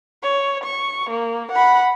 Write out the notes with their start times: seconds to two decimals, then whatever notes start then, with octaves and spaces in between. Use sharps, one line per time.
0.23 C#5
0.64 C#6
1.10 A#3
1.52 F#5 B5